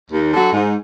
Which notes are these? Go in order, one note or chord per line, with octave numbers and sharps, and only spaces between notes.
D#2
D3 F#3
G#2